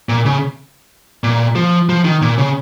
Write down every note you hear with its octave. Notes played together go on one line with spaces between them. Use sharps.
A#2
C#3
A#2
F3
F3
D#3
A#2
C#3